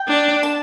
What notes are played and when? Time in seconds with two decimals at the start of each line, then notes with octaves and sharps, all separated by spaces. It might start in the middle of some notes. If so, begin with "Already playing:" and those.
Already playing: G5
0.08 D4
0.43 A5